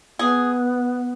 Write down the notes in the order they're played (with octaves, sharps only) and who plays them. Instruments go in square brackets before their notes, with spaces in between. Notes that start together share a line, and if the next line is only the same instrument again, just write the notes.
[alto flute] B3 [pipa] G#4